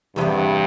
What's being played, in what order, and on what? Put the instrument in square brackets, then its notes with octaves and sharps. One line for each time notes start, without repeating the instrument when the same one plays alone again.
[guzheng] E2 C3 E3 B3 [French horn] G2